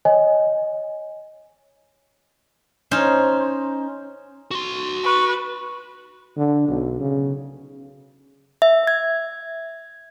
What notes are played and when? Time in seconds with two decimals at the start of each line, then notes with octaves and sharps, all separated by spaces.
0.05 C#5 D#5 G#5
2.91 C#4 D#4 C5
4.51 F#4 C6
5.04 B4 C#6
6.37 D3
6.68 B1
7.00 C#3
8.62 E5
8.87 G#6